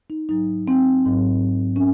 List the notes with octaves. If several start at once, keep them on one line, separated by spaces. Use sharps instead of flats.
D#4
G#2 F#3 D#4
C4
G#2 F#3
C#4